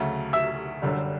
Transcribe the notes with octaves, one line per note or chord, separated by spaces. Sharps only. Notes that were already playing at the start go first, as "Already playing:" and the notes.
Already playing: D2 C#3 F#3 A3
E5 E6
G1 F#2 D3 G3